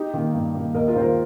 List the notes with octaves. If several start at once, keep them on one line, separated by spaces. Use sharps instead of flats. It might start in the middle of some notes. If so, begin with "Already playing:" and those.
Already playing: D#4 G4
D#3 A#3
G2
D#3 A#3
D#2 A#4 D#5
F4 A#4
D#3 A#3 C5
F4 A#4